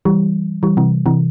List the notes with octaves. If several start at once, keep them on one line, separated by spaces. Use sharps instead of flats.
E3 G3
E3 G3
C3 E3
C3 E3